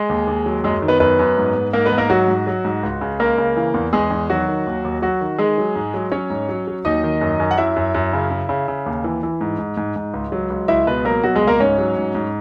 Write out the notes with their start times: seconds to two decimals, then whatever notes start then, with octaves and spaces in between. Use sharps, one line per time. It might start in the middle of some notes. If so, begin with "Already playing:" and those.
Already playing: G#3 G#4
0.09 D#2
0.27 D#2
0.46 F#3
0.64 F#2 G#3 G#4
0.82 D#3
0.88 B3 B4
1.00 F#2 B3 B4
1.19 F#2
1.37 G#2
1.56 G#2
1.73 G#2 A#3 A#4
1.86 B3 B4
1.92 G#2
1.98 A#3 A#4
2.10 F#3 F#4
2.28 G#2
2.47 F#3
2.65 G#2
2.83 C#2
3.01 C#3
3.20 C#2 A#3 A#4
3.38 C#3
3.57 E3
3.74 E2
3.93 E2 G#3 G#4
4.11 E2
4.30 D#3 F#3 F#4
4.48 D#3
4.67 D#2
4.85 D#2
5.02 F#3 F#4
5.21 D#3
5.38 D#3 G#3 G#4
5.58 F#3
5.76 G#2
5.94 F#3
6.12 F#3 C#4 C#5
6.30 G#2
6.49 F#3
6.67 F#3
6.85 D#2 D#4 D#5
7.04 D#3
7.21 F#2
7.40 F#2
7.51 F#5
7.58 F#2 E4 E5
7.76 F#2
7.95 F#2
8.13 C#3
8.31 C#3
8.49 C#3
8.68 C#3
8.86 D#2
9.04 E3
9.23 E3
9.41 G#2
9.59 G#2
9.77 G#2
9.96 G#2
10.14 C#2
10.32 F#3
10.50 C#2
10.68 C#2 E4 E5
10.87 B2 B3 B4
11.05 F#3 A#3 A#4
11.23 B2 F#3 F#4
11.35 G#3 G#4
11.42 C#2
11.47 A#3 A#4
11.60 G#2 C#4 C#5
11.78 F#3
11.97 G#2
12.15 G#2